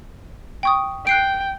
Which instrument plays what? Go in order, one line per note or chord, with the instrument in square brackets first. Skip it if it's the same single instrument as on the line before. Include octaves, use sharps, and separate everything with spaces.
[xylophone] G5 C#6 D#6
[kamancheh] G5 [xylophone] F#6 C7 D7